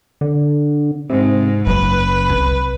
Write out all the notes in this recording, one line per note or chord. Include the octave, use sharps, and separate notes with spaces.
D3
G#2 C3
F#1 F#3 B4
C2